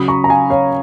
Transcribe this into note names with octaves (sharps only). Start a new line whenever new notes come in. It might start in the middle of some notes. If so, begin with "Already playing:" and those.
Already playing: C#3 F#3 B5 D#6
A#5 C#6
A#5
F5 G#5
C#5 F5